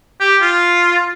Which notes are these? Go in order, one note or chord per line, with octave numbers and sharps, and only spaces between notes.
G4
F4